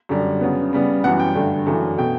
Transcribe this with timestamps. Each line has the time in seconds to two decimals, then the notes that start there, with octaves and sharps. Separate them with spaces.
0.09 F#2 D3 G3
0.41 C#3 F#3 B3
0.73 C#3 G3 B3
1.03 F#2 E3 G3 B3 F#5
1.19 G5
1.35 G2 D3 A3
1.66 F#2 C#3 E3 A3
1.98 B2 A3 G5